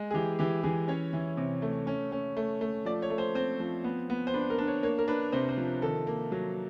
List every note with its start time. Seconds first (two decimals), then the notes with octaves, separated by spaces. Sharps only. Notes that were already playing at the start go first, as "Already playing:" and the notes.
Already playing: G#3
0.11 G#4
0.14 E3 G4
0.39 E3 G4
0.63 E3 G#4
0.88 C#4 C#5
1.13 E3
1.37 C3
1.62 A3
1.87 C#4
2.12 C#4
2.37 A3
2.61 A3
2.85 F3 D5
3.02 C#5
3.10 A3
3.18 C5
3.35 C4 C5
3.60 F3
3.84 B3
4.10 B3
4.27 C5
4.34 D4 B4
4.50 A#4
4.58 D4
4.67 C#5
4.83 A#3 C#5
4.98 A#4
5.08 D4 B4
5.32 C3 C5
5.49 C5
5.57 F3
5.82 D#3 A4
6.07 A#3
6.32 F#3